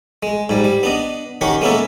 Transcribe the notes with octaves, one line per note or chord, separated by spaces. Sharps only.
G#3
G#2 G3
G3
B3 D4 D#5
D#3 C#4 G4 F#5
G#3 A#3 B3 C#4 E4 A4